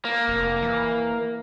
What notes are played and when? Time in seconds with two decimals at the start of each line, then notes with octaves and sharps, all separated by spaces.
0.05 A#3
0.28 F1
0.63 E3